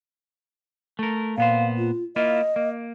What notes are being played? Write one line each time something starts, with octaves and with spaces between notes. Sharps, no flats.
A3 A#4
A#2 B3 C5 F5
F4
A#3 E4 F4 D#5
A#3